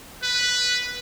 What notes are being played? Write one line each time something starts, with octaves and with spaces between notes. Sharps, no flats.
B4